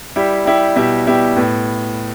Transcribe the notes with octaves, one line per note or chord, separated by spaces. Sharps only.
G3 E4 G4
G3 E4 G4
B2 G3 E4 G4
B2 G3 E4 G4
A2 B3